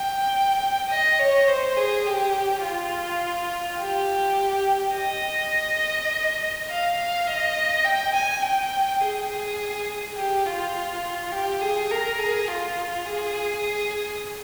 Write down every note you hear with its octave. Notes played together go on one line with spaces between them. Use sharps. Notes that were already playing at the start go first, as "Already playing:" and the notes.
Already playing: G5
D#5
C#5
C5
G#4
G4
F4
G4
D#5
F5
F5
D#5
G5
G#5
G5
G#4
G4
F4
G4
G#4
A#4
G#4
F4
G#4